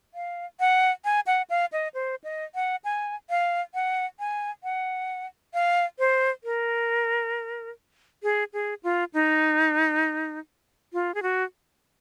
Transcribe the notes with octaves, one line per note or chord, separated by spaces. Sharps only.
F5
F#5
G#5
F#5
F5
D#5
C5
D#5
F#5
G#5
F5
F#5
G#5
F#5
F5
C5
A#4
G#4
G#4
F4
D#4
F4
G#4
F#4